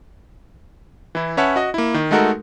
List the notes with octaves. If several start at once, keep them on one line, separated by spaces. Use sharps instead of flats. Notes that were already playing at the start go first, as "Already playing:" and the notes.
E3 E4
C#4 B4 C#5 E5 F#5 A5
F#4 D#5
A#3 E4
D#3
G#3 A3 D#4 F#4 A4 A#4